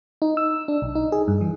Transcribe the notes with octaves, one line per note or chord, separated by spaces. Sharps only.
D#4
E6
D4
B1
D#4
G#4
G2
E3